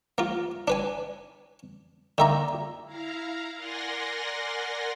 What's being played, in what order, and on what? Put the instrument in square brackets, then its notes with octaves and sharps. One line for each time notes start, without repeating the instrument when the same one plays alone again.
[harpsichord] A#3 F4
D4 B4 G#5
[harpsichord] D3 E5 A#5 [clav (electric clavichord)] D#3 A#3
[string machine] E4 F5 A#5
A#4 D5 F#5 G#5 C6 A#6